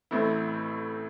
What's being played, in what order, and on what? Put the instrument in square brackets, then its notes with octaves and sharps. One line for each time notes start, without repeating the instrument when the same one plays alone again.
[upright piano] A1 A2 A3 C4 E4